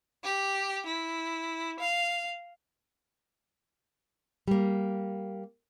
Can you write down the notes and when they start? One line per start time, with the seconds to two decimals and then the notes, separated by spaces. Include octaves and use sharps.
0.24 G4
0.87 E4
1.81 F5
4.48 G3 A#3